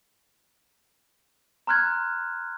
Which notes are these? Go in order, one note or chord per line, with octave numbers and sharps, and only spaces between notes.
A#5 C6 F6 F#6 G#6